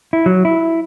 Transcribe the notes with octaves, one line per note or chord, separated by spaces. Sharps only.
E4
F#3
E4